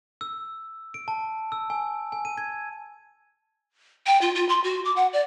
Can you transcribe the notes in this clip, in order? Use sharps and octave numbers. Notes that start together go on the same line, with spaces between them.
E6
D7
A5
E6
G#5
G#5
D#7
G#6
G5
F4
F4
C6
F#4
D6
F#5
D5